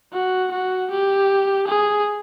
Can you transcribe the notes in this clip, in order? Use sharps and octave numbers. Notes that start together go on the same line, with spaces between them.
F#4
F#4
G4
G#4